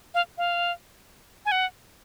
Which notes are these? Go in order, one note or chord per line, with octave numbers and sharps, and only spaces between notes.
F5
F5
G#5
F#5